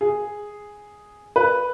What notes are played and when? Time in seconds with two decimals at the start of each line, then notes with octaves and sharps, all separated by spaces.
0.01 G#4
1.36 B4